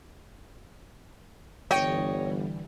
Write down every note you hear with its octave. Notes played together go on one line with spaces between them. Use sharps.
G1 D3 E3 G3 C#5 D#5 G5